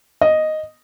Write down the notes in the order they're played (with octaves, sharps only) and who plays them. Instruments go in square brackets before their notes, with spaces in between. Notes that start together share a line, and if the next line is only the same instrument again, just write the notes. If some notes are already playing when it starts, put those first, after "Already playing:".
[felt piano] D#5